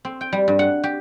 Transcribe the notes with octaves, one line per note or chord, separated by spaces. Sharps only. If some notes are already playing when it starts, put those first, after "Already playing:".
C4
G5
G3
G2
F#5
G4